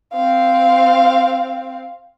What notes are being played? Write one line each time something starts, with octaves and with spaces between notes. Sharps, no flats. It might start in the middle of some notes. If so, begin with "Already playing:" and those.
C4 F5